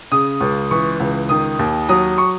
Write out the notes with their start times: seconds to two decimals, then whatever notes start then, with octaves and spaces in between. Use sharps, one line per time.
0.11 C#3 D#6
0.41 C#2
0.71 E3 C#6
1.00 C#2
1.29 D#3 D#6
1.59 D#2
1.89 F#3 D#6
2.18 C#6